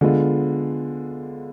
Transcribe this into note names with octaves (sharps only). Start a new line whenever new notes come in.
D3 G#3 B3 F4